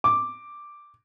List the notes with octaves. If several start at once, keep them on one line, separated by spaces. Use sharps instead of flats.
D6